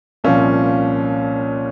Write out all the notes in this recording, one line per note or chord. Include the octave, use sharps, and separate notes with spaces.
C2 A#2 F3 C#4